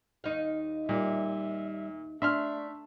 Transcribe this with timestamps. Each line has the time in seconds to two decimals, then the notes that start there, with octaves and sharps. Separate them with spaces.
0.24 D#2 D#4 F5
0.89 A#2 G3 E5
2.22 A3 D4 E5 C6 F6